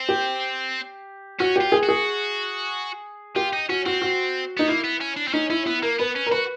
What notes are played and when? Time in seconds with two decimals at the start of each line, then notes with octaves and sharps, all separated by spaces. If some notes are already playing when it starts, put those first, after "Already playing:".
Already playing: C4
0.09 G4
1.40 C#4 F#4
1.56 G4
1.61 F4
1.72 G#4
1.83 F#4
1.89 G#4
3.36 F4 G4
3.53 D#4
3.69 C#4 F#4
3.86 C4 F#4
4.02 F#4
4.57 B3 D#4
4.67 A#3 E4
4.84 B3
5.01 C#4
5.16 D4
5.27 C4
5.33 C#4 D#4
5.50 C#4 E4
5.66 B3 E4
5.82 A#3 A#4
5.99 B3 B4
6.16 C#4
6.26 A#4
6.31 F#4 B4